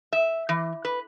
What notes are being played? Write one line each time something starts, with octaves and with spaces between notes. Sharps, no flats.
E5
E3
B4